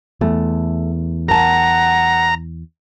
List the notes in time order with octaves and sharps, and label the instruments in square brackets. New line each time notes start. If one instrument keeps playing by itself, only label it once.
[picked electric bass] E2 [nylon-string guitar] A3
[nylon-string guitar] A#4 A5 [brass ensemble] F#5 [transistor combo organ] A#5